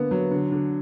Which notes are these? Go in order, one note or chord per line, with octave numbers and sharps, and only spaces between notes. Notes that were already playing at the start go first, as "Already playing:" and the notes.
Already playing: D3 A#3 B3
F#3
D3
D3